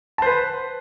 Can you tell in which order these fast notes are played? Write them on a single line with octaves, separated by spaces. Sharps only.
A5 C5 B4